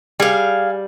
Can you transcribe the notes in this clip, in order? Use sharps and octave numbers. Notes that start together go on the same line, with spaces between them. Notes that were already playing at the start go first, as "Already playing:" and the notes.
G3 G#4 F5